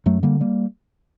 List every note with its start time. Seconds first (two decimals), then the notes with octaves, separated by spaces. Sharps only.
0.06 F#2 F#3 A3
0.23 D3 G3 A#3
0.41 G3 A#3